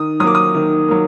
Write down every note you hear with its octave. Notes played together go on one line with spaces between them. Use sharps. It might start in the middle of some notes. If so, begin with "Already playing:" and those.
Already playing: D#3 D#6
F#3 A#3 D6 D#6
D#6
D#3
F#3 A#3